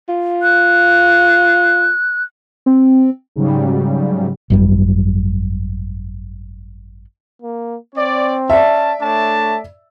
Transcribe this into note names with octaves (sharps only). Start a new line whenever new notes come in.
F4
F#6
C4
G#2 C#3 F#3 G3
G#1 F#2 G3
A#3
C4 C#5 D5
C#4 D5 E5 A5
A3 D4 C#5 A5